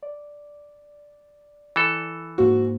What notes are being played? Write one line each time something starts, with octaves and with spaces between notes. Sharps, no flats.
D5
E3 A4
G#2 A#3 F#4 C5